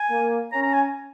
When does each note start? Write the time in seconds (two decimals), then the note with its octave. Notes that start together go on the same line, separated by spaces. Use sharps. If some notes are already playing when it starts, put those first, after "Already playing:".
Already playing: G#5
0.09 A#3
0.52 C#4 A#5
0.63 A#5
0.73 G#5